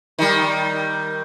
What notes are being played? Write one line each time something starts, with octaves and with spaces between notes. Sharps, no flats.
D#3 G3